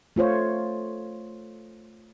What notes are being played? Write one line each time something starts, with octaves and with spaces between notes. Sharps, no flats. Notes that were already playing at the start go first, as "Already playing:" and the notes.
A3 F4 C5 C#5